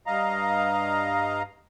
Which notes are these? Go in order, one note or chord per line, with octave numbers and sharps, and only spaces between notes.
G2 D#5 F5 A#5